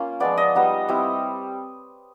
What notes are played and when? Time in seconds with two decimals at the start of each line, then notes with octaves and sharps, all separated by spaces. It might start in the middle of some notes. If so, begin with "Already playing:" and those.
Already playing: A#3 C#4 F4
0.20 F3 G#3 B3 D5
0.37 D#5
0.55 G3 B3 D#4
0.88 G3 C4 E4